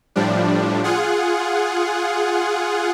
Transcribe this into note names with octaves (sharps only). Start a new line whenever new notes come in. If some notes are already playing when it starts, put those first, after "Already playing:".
A2 F3 G3 D4
F4 G#4 F#5